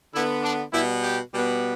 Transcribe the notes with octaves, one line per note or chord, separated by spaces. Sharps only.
D3 B3 E4
D4
B2 G3 B3 E4
G4
B2 G3 B3